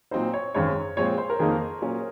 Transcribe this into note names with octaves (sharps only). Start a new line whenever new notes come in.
A#2 F#3 C4 D#4 C5
C#5
G#1 F#2 D#3 G#3 C4 C#5
A#2 F3 G#3 C4 C#5
C5
A#4
F2 D#3 A#3 D#4 G#4
A#2 F#3 C#4